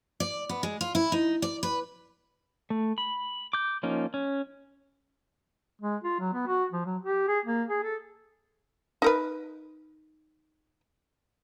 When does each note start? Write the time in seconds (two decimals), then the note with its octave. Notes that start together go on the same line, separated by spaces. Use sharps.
0.20 D5
0.49 B3
0.63 G#3
0.81 F4
0.95 E4
1.12 D#4
1.42 D5
1.63 B4
2.70 A3
2.98 B5
3.53 D6 G6
3.83 F3 A#3 C#4 D#4
4.14 C#4
5.82 G#3
6.04 F4
6.20 F#3
6.34 B3
6.47 F#4
6.72 F3
6.85 F#3
7.03 G4
7.28 G#4
7.45 A#3
7.69 G#4
7.83 A4
9.02 D#4 A#4 B4